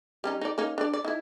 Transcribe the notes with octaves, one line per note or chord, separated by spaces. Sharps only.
G3 C#4 D#4
D#4 D5
A#3 C#4 D#4
D4 D5
D5
D#4 E4